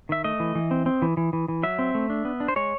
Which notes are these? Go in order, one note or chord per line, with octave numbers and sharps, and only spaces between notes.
D#3 E5
A3 D#5
E3
E3
C4
C4
E3
E3
E3
E3
F#3 E5
C4
A3
D4
B3
D4
C5
G#3 C#5